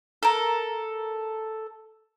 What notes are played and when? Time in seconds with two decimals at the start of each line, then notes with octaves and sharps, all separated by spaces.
0.23 A4 A#4